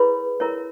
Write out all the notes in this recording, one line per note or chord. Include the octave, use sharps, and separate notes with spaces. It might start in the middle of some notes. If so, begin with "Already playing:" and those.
Already playing: E4 G#4 B4 C#5 B5
E4 A#4 C#5